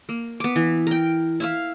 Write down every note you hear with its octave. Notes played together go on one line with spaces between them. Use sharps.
A#3
B3 D6
E3
A#4 G5
E4 E5 F5